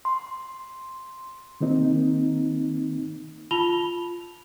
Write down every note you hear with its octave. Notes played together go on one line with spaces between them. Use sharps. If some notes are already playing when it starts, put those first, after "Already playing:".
C6
D#3 A#3 C4 D#4
F4 A5 B5 F7 G7